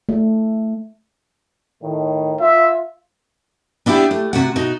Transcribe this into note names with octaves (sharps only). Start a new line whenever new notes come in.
A3
A2 D#3
F4 E5
B3 D4 E4 F4 G4
A3
C3 F#4 F#5
B2 D#4 F#4